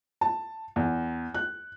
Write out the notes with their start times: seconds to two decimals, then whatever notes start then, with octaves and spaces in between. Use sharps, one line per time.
0.21 A5
0.76 E2
1.34 F#6